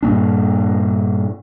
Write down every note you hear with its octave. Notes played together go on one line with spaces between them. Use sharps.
G2 A#2 A#3 D4